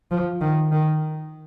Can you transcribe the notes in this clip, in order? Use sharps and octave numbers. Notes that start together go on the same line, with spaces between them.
F3
D#3
D#3